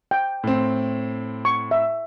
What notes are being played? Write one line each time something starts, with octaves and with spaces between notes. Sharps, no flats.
G5
A2 C4
C#6
E5